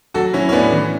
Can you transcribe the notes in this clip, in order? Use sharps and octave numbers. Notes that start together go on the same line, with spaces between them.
F#3 F#4 A4
F#3 C#4 E4
C#4
A2 B3 D4
E3